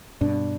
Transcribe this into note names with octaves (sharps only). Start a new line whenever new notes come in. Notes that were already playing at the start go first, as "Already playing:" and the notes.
G2 B2 D4